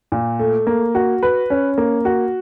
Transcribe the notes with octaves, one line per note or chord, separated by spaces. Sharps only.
A#2
A3
A#3
F#4
B4
C#4
A#3
F#4